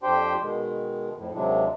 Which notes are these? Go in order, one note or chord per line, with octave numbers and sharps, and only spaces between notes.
F2 D4 G4 C5 G5 C6
B2 D#3 G#3
F2 A2
D#2 C3 F#3 G#3 D4